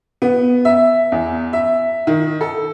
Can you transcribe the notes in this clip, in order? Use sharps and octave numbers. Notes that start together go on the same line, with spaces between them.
B3
E5
E2
E5
D#3
A4